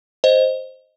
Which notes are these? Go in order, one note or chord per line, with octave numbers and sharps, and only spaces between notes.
C5 D#5